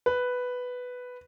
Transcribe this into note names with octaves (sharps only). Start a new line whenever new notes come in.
B4